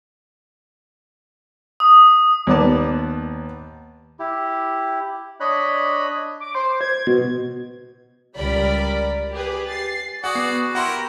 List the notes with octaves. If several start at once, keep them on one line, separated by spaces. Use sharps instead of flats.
D#6
D#2 B3 D5 A5
E4 G4
D4 C#5 D#5 B5 F#6
D6
C5
G#6
B2
C#2 G3 A#4 D5 B5
G4 G#4 B4
A6 C7
F#4 G#4 D5 F#5
B3 C7
E4 G4 A#4 F#5 C6